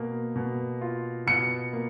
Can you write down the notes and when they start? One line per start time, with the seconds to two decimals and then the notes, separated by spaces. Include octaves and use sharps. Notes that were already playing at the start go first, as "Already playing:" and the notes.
Already playing: B2 A#3
0.36 B2
0.81 F4
1.27 B2 C#7
1.73 A#3